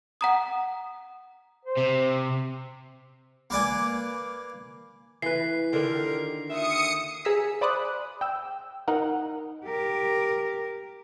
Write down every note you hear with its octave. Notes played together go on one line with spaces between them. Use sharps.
F#5 A#5 D#6
C5
C3
A#3 B4 D5 G#5
E3 B4 C7
D3 D#3 F4 G4 A#4
D#2 F4 E5 D#6 C#7
G#4 A#5 E6 B6
C5 D5 B5 D6 D#6 F#6
G5 E6
D#4 A#4 F#5
G4 A#4